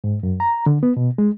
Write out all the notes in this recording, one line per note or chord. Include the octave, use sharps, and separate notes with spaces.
G#2
F#2
A#5
D3
B3
B2
G#3